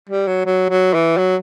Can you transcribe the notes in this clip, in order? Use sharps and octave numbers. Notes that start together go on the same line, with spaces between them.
G3
F#3
F#3
F#3
E3
F#3